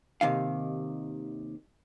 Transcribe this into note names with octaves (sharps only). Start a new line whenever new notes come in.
D#2 C3 D#3 F5